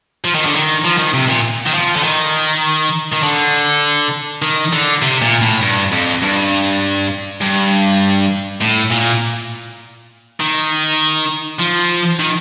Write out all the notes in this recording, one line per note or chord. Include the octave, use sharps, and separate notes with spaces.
F3
D#3
D3
D#3
F3
D#3
C3
A#2
D#3
F3
D3
D#3
D#3
D3
D#3
D3
C3
A#2
A2
G2
F2
G2
G2
A2
A#2
D#3
F3
D#3